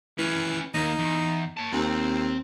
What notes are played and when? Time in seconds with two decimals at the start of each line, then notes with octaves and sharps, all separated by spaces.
0.18 E3 C#4 B4
0.74 D#2 A#3 D#4
0.99 E2
1.57 C#5 A5
1.73 D#2 C4